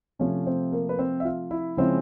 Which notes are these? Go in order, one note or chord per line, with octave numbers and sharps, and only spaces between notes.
C3 F3 A3 C#4 C#5
C4 C5
A#3 A#4
B4
C4 C5
E5
F4 F5
E4 E5
C#3 F3 G#3 C4 C#4 E4 C5